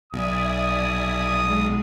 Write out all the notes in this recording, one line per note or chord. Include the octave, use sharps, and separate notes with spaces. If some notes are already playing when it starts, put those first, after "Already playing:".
B1 D5 E5 G#5 D#6
G#3